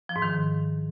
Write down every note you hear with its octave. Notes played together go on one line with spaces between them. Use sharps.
F3
G#2
D#3